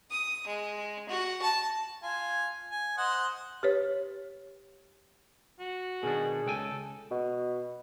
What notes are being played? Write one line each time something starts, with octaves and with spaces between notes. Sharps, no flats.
D#6
G#3
F#4
A5
F4 G#5
G#5
C5 D#5 F#5
G4 B4 C#5
F#4
B2 D#3 D4 G#4
C#2 A4 G5 G#5
B2